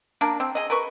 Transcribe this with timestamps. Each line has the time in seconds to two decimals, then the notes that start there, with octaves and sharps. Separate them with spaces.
0.21 A#3 D4 A#4
0.40 C4
0.55 G#4 D#5
0.70 A#4 B4 C#6